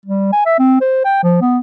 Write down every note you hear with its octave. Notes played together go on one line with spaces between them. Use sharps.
G3
G#5
E5
C4
C5
G5
F3
B3